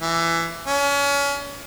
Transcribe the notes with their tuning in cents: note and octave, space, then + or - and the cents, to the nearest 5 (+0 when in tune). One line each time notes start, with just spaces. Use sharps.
E3 +20
C#4 +30